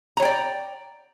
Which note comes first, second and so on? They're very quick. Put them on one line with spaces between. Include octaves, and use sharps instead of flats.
A#5 C#5 G5 D5